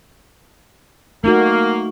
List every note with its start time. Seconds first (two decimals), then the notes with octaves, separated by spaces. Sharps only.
1.24 A3 A#3 D#4 F#4